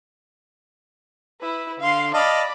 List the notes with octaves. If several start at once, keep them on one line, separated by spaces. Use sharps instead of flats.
E4 B4
D3 F5 C6
D5 D#5 F5 A5 B5